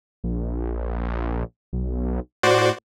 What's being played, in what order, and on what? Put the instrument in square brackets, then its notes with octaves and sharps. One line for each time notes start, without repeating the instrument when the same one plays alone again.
[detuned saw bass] A#1
B1
[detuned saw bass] A2 [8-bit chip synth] F#4 C5 D5